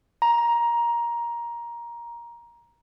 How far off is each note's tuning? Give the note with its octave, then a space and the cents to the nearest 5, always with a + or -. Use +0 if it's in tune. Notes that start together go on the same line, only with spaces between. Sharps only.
A#5 +15